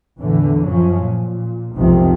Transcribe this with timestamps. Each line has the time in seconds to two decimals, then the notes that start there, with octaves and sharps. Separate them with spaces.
0.18 E2 A2 D3 E3
0.66 F#2 F3 F#3 C#4
1.00 A#2
1.75 F1 B1 G#2 C3 D#3 F3